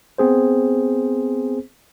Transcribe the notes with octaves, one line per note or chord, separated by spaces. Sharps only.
B3 C4 G#4 C5